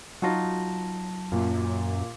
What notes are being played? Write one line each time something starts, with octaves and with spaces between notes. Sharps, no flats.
F#3 D#4 F4 F#4 A5 A#6
F#2 A#2